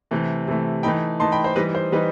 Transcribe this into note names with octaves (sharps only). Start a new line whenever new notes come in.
C3 E3 A3
C3 E3 A3
E3 A3 D#4 G5 B5
E3 A3 D#4 A5 C6
G5 B5
C5
E3 G3 D#4 B4 D#5
C5
E3 G3 D#4 B4